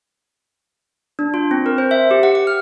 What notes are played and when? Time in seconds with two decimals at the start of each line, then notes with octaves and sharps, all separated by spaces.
1.19 D4
1.34 F4
1.51 C4
1.66 A#4
1.78 C5
1.91 E5
2.11 G4
2.23 F#5
2.35 F#5
2.47 F6